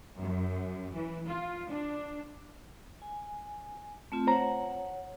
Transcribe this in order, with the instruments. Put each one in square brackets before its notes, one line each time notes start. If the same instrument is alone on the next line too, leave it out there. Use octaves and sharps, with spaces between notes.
[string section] F#2
E3
F4
D4
[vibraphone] G#5
A3 C4 F4
[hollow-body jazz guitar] C5 A#5 [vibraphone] C#5 F#5